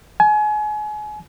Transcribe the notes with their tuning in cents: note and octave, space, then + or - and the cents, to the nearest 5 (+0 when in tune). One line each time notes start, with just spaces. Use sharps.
G#5 +30